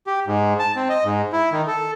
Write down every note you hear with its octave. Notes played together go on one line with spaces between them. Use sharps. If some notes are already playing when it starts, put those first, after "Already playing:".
G4
G#2
A5
C4
D#5
G#2
E4
D#3
A4